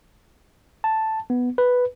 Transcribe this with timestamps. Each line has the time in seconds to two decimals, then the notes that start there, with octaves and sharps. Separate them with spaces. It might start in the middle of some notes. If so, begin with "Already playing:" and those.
0.84 A5
1.30 B3
1.58 B4